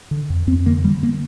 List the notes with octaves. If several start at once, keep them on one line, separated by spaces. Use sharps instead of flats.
D3
F2
F2 C4
D3 A#3
D3 G3
A#3